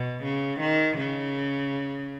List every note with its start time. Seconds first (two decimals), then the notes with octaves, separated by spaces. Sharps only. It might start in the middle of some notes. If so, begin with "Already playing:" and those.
Already playing: B2
0.23 C#3
0.60 D#3
0.98 C#3